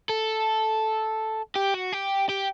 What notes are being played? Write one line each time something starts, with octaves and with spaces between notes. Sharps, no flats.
A4
G4
F#4
G4
G4